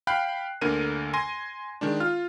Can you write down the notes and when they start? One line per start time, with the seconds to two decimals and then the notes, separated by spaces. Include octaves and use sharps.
0.07 F5 G5 B5 F#6 C7
0.61 D2 D3 A#3 A#4 D#7
1.14 G#5 C6 A#6 D#7
1.81 D#3 G#3 D4
2.00 F4 F6